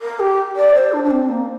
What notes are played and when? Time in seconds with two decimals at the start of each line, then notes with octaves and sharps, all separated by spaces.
0.01 A#4
0.19 G4
0.56 D5
0.74 C5
0.93 D4
1.04 D4
1.11 C4
1.29 A#3